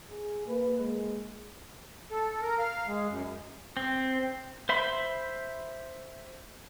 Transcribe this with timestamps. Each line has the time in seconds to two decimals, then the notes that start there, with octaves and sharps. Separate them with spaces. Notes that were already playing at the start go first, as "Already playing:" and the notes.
0.11 G#4
0.47 A#3 B4
0.79 G#3
2.11 A4
2.42 A#4
2.59 F5
2.87 G#3
3.09 F#2
3.77 C4
4.69 C5 E5 B5 C6